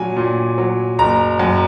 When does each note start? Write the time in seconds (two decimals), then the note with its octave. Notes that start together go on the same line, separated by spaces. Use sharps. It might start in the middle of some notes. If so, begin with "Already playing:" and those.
Already playing: A#2 F#3 G#5
0.16 A#2
0.58 F#3
0.99 F#1 A#5
1.39 F#2